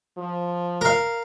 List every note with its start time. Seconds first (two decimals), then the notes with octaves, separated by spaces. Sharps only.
0.18 F3
0.81 A#4 F5